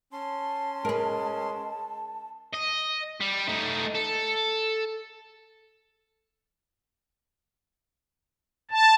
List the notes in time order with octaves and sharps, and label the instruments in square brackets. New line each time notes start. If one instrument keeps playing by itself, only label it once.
[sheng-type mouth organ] C#4 C6 [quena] A5
[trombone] G#3 [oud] A#4 B4
[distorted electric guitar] D#5
G3
A3 D#4
A4
[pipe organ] A5